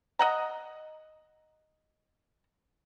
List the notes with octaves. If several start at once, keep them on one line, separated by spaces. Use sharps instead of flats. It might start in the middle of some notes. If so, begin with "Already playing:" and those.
D#5 F#5 A#5